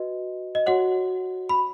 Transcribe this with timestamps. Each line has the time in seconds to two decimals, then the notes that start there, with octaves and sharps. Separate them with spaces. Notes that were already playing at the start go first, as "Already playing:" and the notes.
Already playing: F#4 B4 D#5
0.55 D#5
0.66 F#4 C#5 F#5
1.49 B5